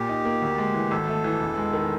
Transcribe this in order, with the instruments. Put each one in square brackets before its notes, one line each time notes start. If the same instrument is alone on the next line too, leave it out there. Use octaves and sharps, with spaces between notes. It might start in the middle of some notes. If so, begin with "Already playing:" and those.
Already playing: [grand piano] A#2 [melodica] G4
[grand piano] D#4
A#3
D2
G#3
E3
[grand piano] G#1 [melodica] A4
[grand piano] A3
E3
E1
G#3
D#3